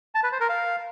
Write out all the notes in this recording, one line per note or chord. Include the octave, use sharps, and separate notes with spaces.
A5
B4
C5
A#4
F5